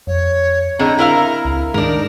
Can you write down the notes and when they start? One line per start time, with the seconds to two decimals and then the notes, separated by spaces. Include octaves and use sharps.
0.07 F2 C#5
0.79 A2 D3 G#3 C4 D4 A#5
0.99 E4 A#4 F5
1.45 C#2
1.74 G#2 D#3 G#3 D4 D#4 A#4